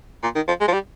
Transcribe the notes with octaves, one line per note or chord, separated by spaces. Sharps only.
A#2
D#3
F3
G#3
F3
G3